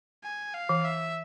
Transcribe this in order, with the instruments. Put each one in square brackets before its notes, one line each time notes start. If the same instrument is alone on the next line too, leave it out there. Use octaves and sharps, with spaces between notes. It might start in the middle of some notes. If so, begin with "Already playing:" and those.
[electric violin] G#5
F5
[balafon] E3
[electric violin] E5